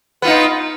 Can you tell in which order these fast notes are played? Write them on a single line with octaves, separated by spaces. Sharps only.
B3 F4 D#4